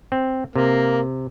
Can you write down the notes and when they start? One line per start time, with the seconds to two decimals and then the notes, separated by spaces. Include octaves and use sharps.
0.12 C4
0.56 C3 A#3